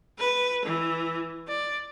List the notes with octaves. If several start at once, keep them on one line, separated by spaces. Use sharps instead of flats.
B4
E3
D5